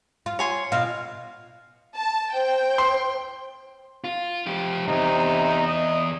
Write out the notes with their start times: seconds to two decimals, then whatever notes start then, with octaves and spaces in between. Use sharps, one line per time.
0.26 F4
0.39 C#5 G#5 C6
0.72 B2 F4 F5
1.95 A5
2.34 C5 G5
2.78 C6
4.04 F4
4.46 F3 G4
4.87 E2 G2 C3 D#4
5.67 D#5